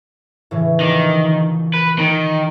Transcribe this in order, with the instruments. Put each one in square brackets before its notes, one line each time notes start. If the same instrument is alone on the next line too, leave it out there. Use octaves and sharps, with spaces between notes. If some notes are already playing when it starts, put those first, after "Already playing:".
[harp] A2 C#3 E3
[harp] A#1 D6 C#7 [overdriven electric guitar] D#3
[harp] A#4 [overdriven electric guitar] B4
[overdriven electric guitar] D#3